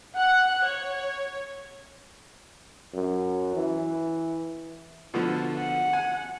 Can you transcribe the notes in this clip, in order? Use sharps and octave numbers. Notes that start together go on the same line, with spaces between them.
F#5 F#6
C#5
F#2
E3
B2 D3 F3
F#5
G#5